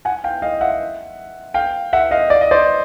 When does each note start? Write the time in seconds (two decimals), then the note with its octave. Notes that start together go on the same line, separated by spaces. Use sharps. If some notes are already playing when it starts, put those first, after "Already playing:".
0.05 F#5 G#5
0.24 F5 G5
0.42 D#5 F5
0.61 E5 F#5
1.54 F5 G5
1.93 E5 F#5
2.11 D#5 F5
2.30 D5
2.41 D#5
2.51 C5 D5